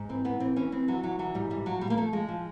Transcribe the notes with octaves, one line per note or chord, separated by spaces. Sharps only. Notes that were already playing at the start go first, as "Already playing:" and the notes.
Already playing: G#2
E3 C4
E3 B3
E3 C4
E3 C#4
E3 C4
E3 F#3
E3 F#3
E3 F#3
G#2 G3
E3 G3
F3 F#3
A#2 G3
A#3
F3 A3
F3 G#3
F3